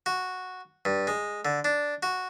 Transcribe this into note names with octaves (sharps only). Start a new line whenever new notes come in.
F#4
G2
G#3
D3
D4
F#4